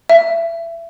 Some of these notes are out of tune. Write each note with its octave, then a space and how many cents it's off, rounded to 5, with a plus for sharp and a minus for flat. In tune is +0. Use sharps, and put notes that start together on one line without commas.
E5 +25